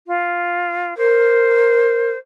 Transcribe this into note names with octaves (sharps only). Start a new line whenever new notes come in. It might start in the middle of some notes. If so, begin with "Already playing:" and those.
F4
A#4 C5